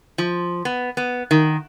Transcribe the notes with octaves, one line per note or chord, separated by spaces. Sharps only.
F3
B3
B3
D#3